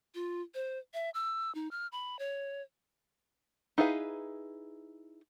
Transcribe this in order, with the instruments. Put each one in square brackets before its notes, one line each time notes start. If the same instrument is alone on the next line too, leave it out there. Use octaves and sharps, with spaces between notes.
[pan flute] F4
C5
E5
E6
D#4
F6
B5
C#5
[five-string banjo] D#4 E4 G#4 B4 F5